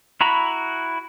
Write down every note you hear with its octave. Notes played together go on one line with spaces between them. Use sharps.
E4 F#4 A#5 B5